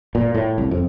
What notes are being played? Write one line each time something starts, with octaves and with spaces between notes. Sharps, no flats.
A#2
A2
C2
F2